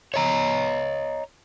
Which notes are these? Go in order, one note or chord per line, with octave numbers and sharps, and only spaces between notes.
C#5 D#5 A#5